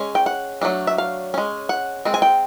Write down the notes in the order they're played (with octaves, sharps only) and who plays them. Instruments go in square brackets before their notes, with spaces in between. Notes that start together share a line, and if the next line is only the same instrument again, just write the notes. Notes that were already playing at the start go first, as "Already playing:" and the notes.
Already playing: [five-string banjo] G#3 C#4
G5
F#5
F#3 A3 D4
E5
F5
G#3 C#4
F#5
G#3 C4
G#5
G5